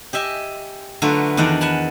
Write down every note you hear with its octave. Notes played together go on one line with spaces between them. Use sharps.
G4 D#5 E5 G#5
D3 F#3 A3 F4 B4
E2 D#3 D4 D5 F#5 A#5
F#5 G#5 A5 B5